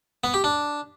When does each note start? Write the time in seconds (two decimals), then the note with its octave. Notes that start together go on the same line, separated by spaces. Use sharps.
0.24 B3
0.34 G4
0.44 D4